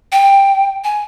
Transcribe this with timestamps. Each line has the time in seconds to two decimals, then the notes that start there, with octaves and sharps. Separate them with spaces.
0.12 G5
0.84 G#5